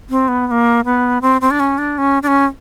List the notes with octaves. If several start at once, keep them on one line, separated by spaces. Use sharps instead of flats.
C4
B3
B3
A#3
B3
C4
C4
D4
C#4
D4
C#4
D4
C#4